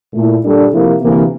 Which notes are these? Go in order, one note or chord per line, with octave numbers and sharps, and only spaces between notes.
A#2 A3 E4
A#2 G3 D4 A4
C3 F3 A#3 E4
D2 C3 E3 A#3